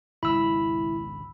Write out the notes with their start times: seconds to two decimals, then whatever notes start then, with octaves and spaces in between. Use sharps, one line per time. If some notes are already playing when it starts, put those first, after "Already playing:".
0.23 G#1 C#2 B2 E4 B5 E6